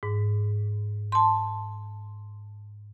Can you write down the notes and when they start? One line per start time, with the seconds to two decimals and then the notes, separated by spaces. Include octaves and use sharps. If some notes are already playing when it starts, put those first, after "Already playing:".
0.03 G#2
1.12 A5 C6